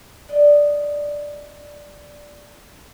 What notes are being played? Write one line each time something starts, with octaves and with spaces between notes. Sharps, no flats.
D4 D5 D#5